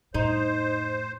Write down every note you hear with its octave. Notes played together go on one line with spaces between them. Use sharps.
F2 A2 D#4 C5